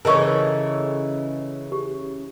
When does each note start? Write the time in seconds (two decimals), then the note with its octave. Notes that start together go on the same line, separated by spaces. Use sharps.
0.05 C#3 E3 C#4 D#4 A4 A#4 C#6
1.72 G4